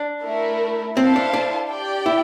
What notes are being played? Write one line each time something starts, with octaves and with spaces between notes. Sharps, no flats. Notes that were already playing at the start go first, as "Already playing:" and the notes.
Already playing: D4
A3 E4 A#4
C4 E4 A4 C5 F5 A5
D4
D4
G4 D5 G5
E4